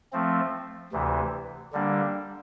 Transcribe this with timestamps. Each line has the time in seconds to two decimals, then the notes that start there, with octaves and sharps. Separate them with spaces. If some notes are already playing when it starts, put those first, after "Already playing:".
0.13 F3 A3 C4
0.93 D2 C3 E3
1.73 D3 G3 A#3 D4